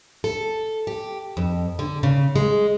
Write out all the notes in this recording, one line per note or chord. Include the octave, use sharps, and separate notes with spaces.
A4
G4
F2
D3
C#3
G#3